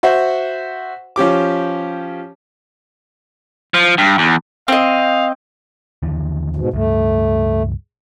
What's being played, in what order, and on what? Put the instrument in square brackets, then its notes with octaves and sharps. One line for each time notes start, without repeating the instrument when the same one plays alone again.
[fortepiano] F#4 C5 E5 F#5
F3 C#4 G4 D6
[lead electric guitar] F3
G2
E2
[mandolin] C4 D#5 [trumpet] F5
[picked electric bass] D#2 D3 E3
[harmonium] G#2 B2
[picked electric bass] C#2 G2 [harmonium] A3